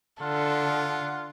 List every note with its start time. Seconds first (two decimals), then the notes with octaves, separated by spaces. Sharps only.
0.22 D3 F4 A4 F#5